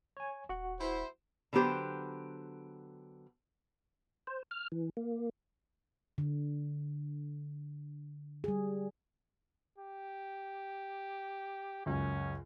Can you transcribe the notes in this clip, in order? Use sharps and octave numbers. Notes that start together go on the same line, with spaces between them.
C#5 G#5
D#1 F#4 F#5
E4 C5
D3 F#3 B3 G4 C5
C5
F6
E3
A#3
D3
G3 G#4
G4
C#2 F#2 C#4